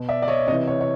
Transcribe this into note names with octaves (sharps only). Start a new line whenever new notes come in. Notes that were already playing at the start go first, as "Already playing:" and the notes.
Already playing: B2
D5 E5
D5
C#5 D#5
C3 E3 C#5 D#5
C#5
C#5